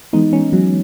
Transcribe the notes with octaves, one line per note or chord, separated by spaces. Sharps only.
E3 G#3 B3 D#4
C#4
F#3